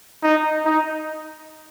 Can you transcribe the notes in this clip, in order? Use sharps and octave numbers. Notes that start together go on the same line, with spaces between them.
D#4
D#4